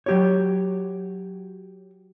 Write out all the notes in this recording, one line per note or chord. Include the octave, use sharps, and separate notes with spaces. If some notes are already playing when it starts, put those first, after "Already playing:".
F#3 G4 C#5